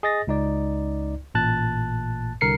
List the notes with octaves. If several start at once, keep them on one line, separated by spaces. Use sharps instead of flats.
G#4 D#5 A6 A#6
C#2 D#4 D5
A1 A#2 A5 F#6 A6
C2 D3 A#4 C7 C#7